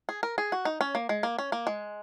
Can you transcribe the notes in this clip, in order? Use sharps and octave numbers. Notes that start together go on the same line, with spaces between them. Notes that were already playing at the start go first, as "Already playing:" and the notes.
G#4
A#4
G#4
F#4
D#4
C#4
A#3
G#3
A#3
C#4
A#3
G#3